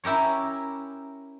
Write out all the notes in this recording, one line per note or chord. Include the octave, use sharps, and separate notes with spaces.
C#4 E4 G4 A#4 C#5